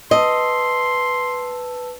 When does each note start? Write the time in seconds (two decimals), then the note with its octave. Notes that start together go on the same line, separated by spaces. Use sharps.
0.11 B4 D#5 A5 C6 E6